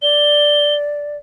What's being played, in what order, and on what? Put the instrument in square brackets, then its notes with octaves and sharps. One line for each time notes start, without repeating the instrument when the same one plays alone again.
[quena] D5 [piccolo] G7